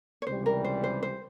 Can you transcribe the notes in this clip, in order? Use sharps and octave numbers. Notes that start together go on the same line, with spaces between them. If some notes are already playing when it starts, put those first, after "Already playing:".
C#5
C#2 C3 E3 G3 C5
A#4
C5
C5
C5